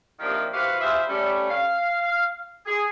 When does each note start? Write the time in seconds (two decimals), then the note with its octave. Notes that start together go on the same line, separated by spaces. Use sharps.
0.19 C3 D#3 F3 A#3 D4 G4
0.53 E4 F#4 G4 B4 C5 F5
0.79 G3 F4 G#4 C5 E5
1.09 G3 A3 C#4
1.49 F5
2.66 G#4